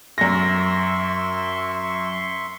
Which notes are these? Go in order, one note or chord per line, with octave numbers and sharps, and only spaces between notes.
F#2 E5 C6 C#6 A#6